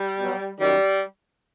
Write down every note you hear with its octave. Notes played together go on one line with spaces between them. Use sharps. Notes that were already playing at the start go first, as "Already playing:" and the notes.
Already playing: G3
B2 F#3
F#2 D#3 F#3 G3